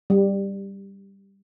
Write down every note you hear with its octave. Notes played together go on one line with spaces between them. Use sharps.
G3